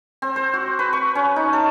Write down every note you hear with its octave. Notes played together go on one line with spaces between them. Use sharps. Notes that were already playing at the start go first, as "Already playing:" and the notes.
C4
C5
F#4
B4
C#6
C#4
D#4
A4